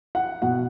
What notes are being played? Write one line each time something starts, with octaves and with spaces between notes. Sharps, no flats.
F#5
B2 F#5